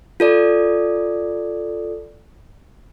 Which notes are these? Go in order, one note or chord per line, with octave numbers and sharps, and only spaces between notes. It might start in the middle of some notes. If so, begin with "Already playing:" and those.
F4 A4 D5